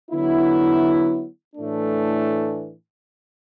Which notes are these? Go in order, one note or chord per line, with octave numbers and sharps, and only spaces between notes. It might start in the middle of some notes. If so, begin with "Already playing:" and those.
D3 F#3 B3 E4
A2 E3 A3 D4